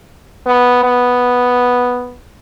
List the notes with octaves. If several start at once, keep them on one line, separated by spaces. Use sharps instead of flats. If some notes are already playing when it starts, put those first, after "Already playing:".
B3
B3